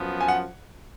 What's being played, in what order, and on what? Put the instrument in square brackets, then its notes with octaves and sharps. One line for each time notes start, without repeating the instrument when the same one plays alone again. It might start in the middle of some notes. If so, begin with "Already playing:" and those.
Already playing: [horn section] F#2 F3 B3
[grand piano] G#5
F#5